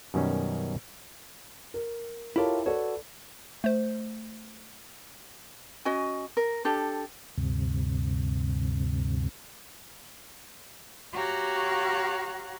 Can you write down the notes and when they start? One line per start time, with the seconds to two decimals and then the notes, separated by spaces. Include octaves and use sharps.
0.14 F#2 B2 D#3 G3 C#4
1.74 A#4
2.36 E4 F4 G4 A4 A#4 C#5
2.66 F#4 A4 B4 C#5 D5
3.64 A3 C5
5.85 C#4 F#4 D#5 G#5
6.37 A#4
6.65 D4 G4 A4
7.38 D2 G2 C3
11.13 F#4 G4 C#5 F5 A#5 F#6